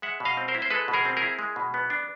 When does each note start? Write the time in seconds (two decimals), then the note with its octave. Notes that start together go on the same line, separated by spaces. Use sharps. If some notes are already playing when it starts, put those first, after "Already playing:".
0.02 G#3 E5 F#5
0.20 B2
0.25 D#5 F5
0.37 C4
0.48 A#4 C5
0.55 E4
0.62 C5
0.70 G#3 A4 B4
0.88 B2
0.93 G#4 A#4
1.05 C4
1.17 G#4 A#4
1.22 E4
1.39 G#3
1.56 B2
1.74 B3
1.90 D4